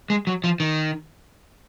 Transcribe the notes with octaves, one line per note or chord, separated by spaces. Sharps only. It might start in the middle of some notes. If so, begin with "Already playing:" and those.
G#3
F#3
F3
D#3